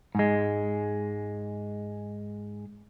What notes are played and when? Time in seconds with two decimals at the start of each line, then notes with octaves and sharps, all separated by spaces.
0.15 G#2 G#3